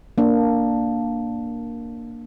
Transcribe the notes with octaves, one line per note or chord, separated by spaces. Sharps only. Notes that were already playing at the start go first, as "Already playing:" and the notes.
A#3 D4